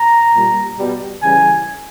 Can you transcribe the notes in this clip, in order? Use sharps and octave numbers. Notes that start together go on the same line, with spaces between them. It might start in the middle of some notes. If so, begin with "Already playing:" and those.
Already playing: A#5
A#2 G3
B2 G3
C#3 E3 G3 G#5